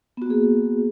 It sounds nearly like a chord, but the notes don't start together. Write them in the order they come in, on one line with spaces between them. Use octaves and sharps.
B3 F#4 A#3 G#4